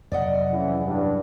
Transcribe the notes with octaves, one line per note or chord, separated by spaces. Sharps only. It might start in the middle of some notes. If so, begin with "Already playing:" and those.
F2 C3 F#3 D5 D#5 F#5
C#3 E3
G2